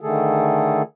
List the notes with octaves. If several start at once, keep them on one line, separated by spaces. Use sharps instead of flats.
D3 D#3 A3 G#4 A4